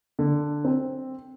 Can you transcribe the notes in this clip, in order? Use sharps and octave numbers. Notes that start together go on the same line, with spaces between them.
D3
C4